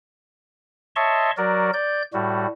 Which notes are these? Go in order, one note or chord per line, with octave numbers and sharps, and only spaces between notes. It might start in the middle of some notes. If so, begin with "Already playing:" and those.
C#5 D#5 E5 A5 C6 C#6
F#3 F#4 A#4 D5
D5 G6
A2 G3 F#4